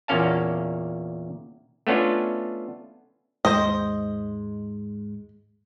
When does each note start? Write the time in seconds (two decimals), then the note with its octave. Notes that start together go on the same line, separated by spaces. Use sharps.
0.08 E2 A#2 A#3 C#4 F5 A5
1.87 A3 B3 C#4 D4 F4
3.45 D#2 G#2 G#3 C5 D#5